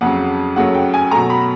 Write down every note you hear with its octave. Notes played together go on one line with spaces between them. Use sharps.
F2 C#3 F#3 F#5
F#2 C#3 F#3 A3 F#5
G5
G#5
B2 F#3 A3 A#5
B5